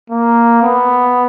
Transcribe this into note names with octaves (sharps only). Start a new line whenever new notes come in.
A#3
B3